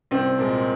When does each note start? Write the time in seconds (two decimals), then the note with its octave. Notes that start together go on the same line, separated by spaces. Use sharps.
0.11 C2 C4
0.38 A#2 G#3